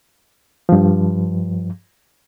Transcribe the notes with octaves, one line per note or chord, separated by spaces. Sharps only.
G2 F3